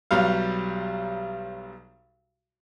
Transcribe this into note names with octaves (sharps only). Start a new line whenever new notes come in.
B1 F#3 G3 F5